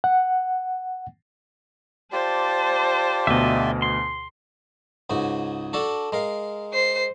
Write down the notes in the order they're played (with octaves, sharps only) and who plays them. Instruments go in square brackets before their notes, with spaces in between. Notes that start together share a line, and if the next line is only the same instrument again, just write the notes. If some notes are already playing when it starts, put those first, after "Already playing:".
[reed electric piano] F#5
[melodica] F4 G4 D5 [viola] C5 A5
[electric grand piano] D2 B2 [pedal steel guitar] D#5 E5
[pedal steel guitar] C6
[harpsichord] C#2 G#2 F#4
D4 F#4 A4
G#3 A#4 F5
[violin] C5 C7